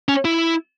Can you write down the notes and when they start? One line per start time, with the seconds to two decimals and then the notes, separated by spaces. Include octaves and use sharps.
0.09 C#4
0.25 E4